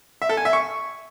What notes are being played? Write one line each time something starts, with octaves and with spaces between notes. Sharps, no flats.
E5
A4
G#5
E5
C#6